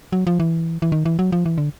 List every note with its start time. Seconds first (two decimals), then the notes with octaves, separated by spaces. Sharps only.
0.12 F#3
0.27 F3
0.40 E3
0.82 E3
0.92 D#3
1.05 E3
1.19 F#3
1.32 F3
1.46 E3
1.58 D3